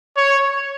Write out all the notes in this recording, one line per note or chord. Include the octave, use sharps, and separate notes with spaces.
C#5